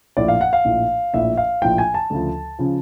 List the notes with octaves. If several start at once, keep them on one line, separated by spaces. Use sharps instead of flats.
A#1 A2 F3 D5
F5
F#5
F5
A#1 A2 F3
A#1 A2 F3 E5
F5
A#1 A2 F3 G5
G#5
A5
D2 C#3 F3
C#3 F3